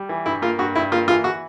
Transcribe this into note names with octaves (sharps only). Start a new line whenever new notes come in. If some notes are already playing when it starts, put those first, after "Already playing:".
Already playing: G3
E3
G2 E4
A#3 F4
G2 F#4
G2 E4
A#3 F4
E3 F4
F#4